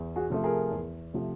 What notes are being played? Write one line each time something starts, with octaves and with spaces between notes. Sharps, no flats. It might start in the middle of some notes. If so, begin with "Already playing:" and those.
Already playing: E2
F#4 G#4
C3 F3 A3
G#4 A#4
E2
C3 F3 A3